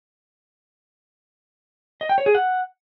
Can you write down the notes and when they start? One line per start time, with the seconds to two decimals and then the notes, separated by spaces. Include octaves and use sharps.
2.01 D#5
2.09 G5
2.18 C#5
2.26 G#4
2.35 F#5